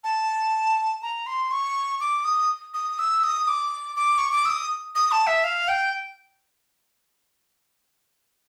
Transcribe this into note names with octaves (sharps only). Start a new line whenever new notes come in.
A5
A#5
C6
C#6
D6
D#6
D#6
E6
D#6
D6
D6
C#6
D6
E6
D#6
D#6
A5
E5
F5
G5